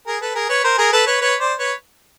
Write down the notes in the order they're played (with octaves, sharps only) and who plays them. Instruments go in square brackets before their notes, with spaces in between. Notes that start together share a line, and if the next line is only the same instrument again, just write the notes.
[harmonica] G#4 A#4
A4 B4
G#4 A#4
B4 C#5
A#4 C5
G#4 A#4
A4 B4
B4 C#5
B4 C#5
C5 D5
B4 C#5